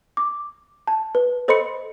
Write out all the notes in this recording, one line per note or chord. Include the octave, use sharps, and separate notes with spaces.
D6
A5
B4
A4 C5 D#5 B5 C6 C#7